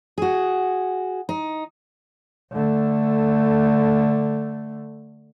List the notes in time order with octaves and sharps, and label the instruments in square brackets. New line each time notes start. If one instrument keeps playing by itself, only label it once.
[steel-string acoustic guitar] F#4 G#4
D#4
[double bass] D3 A3